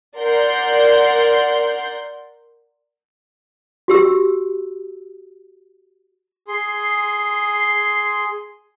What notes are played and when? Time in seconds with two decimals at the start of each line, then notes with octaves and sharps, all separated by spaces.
0.16 A#4 D5 F#5 C6 G6
3.88 F#4 G4 E6
6.48 G#4 C6